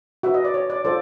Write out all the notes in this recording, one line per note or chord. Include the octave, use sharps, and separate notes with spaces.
F#4 B4 E5
D#5
D5
C#5
D5
F4 A4 C5 D5